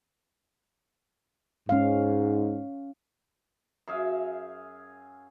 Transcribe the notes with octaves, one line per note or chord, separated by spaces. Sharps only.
G#2 C#4 F5
F#2 G#4 E5 F5